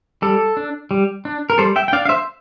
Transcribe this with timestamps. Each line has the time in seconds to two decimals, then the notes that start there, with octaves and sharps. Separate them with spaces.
0.22 G3 A4
0.57 D4
0.91 G3
1.25 D4
1.50 A#4
1.58 G3 A4 C5
1.76 E5 G5
1.88 G5
1.93 D4 D5 F5
2.06 F5
2.09 C5 E5